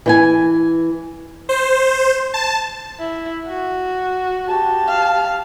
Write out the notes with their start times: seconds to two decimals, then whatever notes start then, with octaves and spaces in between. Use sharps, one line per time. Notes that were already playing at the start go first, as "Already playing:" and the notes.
0.06 E3 G5 G#5
1.49 C5
2.34 A5
2.99 E4
3.47 F#4
4.47 G4 A5
4.88 F5